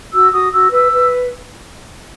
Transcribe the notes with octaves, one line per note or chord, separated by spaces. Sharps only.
F#4 E6
F#4 D#6
F#4 E6
B4 E6
B4